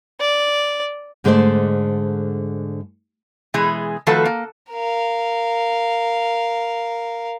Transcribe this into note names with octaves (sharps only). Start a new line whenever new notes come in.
D5
G#2 D3 G#3 A3 C5 D5
B2 E3 G#3 G#4
D#3 F3 A3 F#4 A4 B4
A#3
A#4 F5